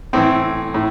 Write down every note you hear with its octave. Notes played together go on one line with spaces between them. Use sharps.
A2 E3 C4
A2